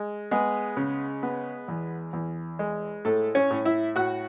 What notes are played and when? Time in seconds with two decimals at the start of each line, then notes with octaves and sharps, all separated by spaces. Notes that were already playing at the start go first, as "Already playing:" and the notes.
Already playing: G#3
0.31 G#3 B3 G#4
0.77 C#3
1.23 B3
1.68 E2
2.13 E2
2.59 G#3
3.05 A2 A3 A4
3.35 C#4 C#5
3.51 A2
3.65 E4 E5
3.96 A2 F#4 F#5